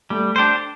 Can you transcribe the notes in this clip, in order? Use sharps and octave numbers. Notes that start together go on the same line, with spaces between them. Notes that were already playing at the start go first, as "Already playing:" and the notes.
G3 A3
D4 G4 C5